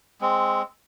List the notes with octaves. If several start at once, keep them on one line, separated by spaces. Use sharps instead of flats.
G#3 C4